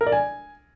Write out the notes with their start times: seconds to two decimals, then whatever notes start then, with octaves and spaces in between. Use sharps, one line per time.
0.01 A#4
0.07 D5
0.12 G#5